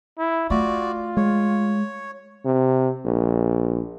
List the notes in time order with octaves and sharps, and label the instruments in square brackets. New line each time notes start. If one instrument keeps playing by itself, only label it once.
[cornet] E4
[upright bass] A3 [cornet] F4 [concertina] F#4 D5
[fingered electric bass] G#3 [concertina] C#5
[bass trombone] C3
A#1